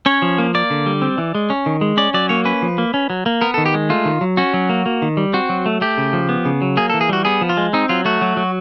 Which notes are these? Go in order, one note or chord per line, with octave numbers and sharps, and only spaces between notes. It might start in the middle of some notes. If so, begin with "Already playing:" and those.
C#4 C#5
F3
A#3
A#3 D5
D3
G3
C4
E3
G#3
C#4
D#3
G#3
C#4 D5
F#3 D5
A#3 C#5
C#4 B4
F3
A#3
C#4
F#3
A#3
B3 A#4
A4
D#3
G4
G#3
A3 F4
D#3
F#3
C#4 F#4
F#3
A#3
A#3
D#3
G3
C4 F#4
F#3
A3
A3 G4
C#3
F3
B3
C#3
F#3
A#3 G#4
A4
E3
G#4
G3 F#4
B3 G#4
F3
F4
G#3
C4 D#4
F#3 F4
A3 F#4
F#3
F#3